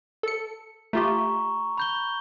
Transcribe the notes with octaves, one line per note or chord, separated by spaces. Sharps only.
A4 C#7
A3 F4 G4 A#5 C#6
B5 G6 G7